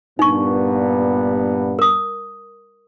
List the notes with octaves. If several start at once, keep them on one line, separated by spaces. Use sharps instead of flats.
G2 A#2 B3 D#4 C#6
A#4 D#6